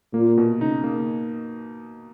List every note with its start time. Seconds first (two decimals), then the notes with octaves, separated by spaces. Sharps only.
0.14 A#2 A#3
0.38 B2
0.60 C#3 D#4
0.84 A#3